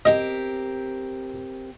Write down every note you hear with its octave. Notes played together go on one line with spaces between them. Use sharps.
C4 G4 A#4 D#5